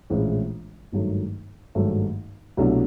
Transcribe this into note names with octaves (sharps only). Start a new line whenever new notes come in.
A#1 A2 E3 G#3 C#4
G#1 G2 D#3 F#3 A3
G#1 G2 D#3 F#3 A3
C2 B2 F#3 A3 D4